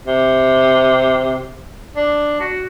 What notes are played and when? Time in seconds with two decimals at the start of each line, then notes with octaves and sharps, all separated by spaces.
0.05 C3
1.96 D4
2.40 F#4